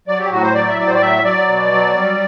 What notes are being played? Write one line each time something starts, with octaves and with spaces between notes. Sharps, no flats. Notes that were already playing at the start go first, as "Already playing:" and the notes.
F#3 D5
G4
A2 F#4
C5
F#3 D5
E5
A2 D5
C5
D5
F#3 E5
F#3 D5
B2
F#3
G3